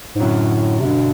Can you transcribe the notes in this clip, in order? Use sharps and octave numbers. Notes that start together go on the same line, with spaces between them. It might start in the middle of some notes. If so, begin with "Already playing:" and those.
G#2
F#2 A2 D3 F#3
C3
G2 B2 D3